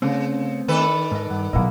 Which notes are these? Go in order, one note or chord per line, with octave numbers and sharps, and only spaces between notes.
C#3 A3 B3 C4
D#3 D4 A4 B4 B5
G#2 D#5
G2 F#5
B2 F#3 G#3 A#3 E4 D#5 F#5